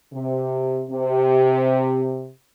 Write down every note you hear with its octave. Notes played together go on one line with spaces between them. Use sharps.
C3
C3